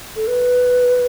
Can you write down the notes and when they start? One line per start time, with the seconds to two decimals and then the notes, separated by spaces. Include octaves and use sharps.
0.15 A4
0.27 B4